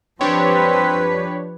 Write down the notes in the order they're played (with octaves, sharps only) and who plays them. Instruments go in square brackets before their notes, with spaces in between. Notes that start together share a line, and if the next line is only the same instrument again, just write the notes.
[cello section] F3 B4 [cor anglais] C4 [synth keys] D4 G4 C#5